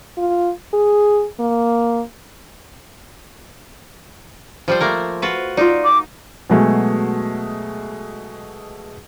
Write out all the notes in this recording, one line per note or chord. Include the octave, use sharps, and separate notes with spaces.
F4
G#4
A#3
F3 G3 C5
A3 A#3 A#4
F4 F#4 B4
D#4 F4 D5
D6
B2 F#3 G#3 A3 G#4